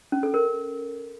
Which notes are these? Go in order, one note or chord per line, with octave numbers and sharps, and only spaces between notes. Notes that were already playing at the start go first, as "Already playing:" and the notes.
C#4
A4
A#4